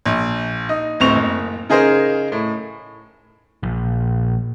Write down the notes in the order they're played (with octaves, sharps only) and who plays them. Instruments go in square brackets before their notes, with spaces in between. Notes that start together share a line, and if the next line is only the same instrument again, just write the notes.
[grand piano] A#1
D#4
D1 G1 C4 C#6 F7
F#1
C#3 D#4 G#4 A#4 C5
A2
[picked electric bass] A#1